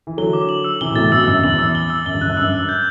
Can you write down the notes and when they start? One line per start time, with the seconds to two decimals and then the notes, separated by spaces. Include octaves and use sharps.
0.07 E3
0.17 D3 F#3 G7
0.33 D6
0.49 F#7
0.64 E6
0.81 C3 E3 G7
0.91 B2
0.96 A2 C3 A6
1.12 G2 B2 E6
1.28 F#2 E6
1.39 F#2
1.43 E2 F#7
1.59 E6
1.75 G7
1.90 E6
2.06 F#2 G7
2.14 G2
2.21 F#2 F#6
2.30 G2
2.37 F#2 E6
2.53 E6
2.69 G6